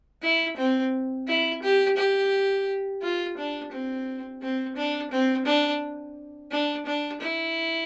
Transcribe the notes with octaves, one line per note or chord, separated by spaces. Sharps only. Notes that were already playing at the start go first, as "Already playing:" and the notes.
E4
C4
E4
G4
G4
F4
D4
C4
C4
D4
C4
D4
D4
D4
E4